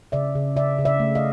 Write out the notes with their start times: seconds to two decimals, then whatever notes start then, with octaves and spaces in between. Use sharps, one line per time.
0.12 C#3 D5 E5
0.35 C#3
0.56 C#3 D5 E5
0.79 C#3
0.85 D5 E5
1.00 A3
1.15 D#5 F5